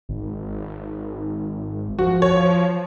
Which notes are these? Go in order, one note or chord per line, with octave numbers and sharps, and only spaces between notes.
G#1
F3 F#4
C#5